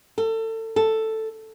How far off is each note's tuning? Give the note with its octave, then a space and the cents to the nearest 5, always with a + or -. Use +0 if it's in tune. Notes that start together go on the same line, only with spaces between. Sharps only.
A4 +30
A4 +5